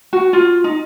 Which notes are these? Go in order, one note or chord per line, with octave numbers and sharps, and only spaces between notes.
F#4
F4
D#4